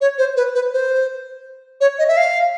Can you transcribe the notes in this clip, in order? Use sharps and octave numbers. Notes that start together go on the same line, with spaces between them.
C#5
C5
B4
B4
C5
C#5
D#5
E5
F5